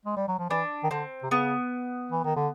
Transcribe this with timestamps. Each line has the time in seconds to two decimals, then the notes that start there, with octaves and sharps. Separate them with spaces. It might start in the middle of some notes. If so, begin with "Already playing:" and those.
0.05 G#3
0.16 G3
0.28 F#3
0.39 F3
0.49 E3 D4
0.83 D#3
0.90 D3 C4
1.23 C3
1.30 C#3 B3
2.12 E3
2.24 D#3
2.36 D3